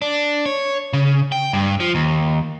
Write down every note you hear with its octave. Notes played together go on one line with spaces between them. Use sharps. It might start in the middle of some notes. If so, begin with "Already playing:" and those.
D4
C#5
C#3
G5
G2
F3
D#2